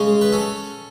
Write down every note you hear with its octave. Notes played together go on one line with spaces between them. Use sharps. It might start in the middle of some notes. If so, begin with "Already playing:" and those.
Already playing: C#3 G#3 C#4 G#4
B4
C#4 A4